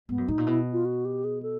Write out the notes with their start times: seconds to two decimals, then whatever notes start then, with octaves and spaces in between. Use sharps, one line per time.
0.09 G#2 B3
0.18 F#2
0.28 A2 D#4
0.38 A#2
0.47 B2 E4
0.73 F4
0.85 F#4
1.05 G4
1.24 G#4
1.43 A4